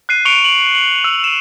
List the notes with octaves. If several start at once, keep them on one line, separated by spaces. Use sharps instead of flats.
F#6 C7 D#7
C#6 C#7 D7 F7 G7
F#7
F#7
E6
D#7 E7